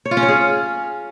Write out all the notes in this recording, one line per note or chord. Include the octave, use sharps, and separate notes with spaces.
C#5
F4
C#4
C#5
G#4